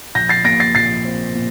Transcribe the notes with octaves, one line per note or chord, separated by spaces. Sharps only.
A#1 G6 A#6
A6 C7
A#2 A#6 D7
A6 C7
A#1 A6 C7
C4
A#2